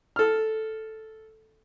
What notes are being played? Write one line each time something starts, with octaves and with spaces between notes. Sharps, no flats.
A4 F6